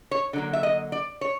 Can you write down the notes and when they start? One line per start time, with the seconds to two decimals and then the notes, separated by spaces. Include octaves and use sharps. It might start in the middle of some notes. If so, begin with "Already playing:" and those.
0.11 C#5
0.33 D3 F#3 A#3
0.53 E5
0.63 D#5
0.92 D5
1.21 C#5